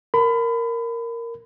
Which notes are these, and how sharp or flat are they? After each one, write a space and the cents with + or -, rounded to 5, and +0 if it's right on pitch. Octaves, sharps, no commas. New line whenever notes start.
A#4 -5 B5 +30